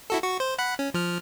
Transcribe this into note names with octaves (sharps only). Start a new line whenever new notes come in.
E4 F#4 A4
F#4 C#6
C5
F#5 B5 F#6
C#4
F3 F6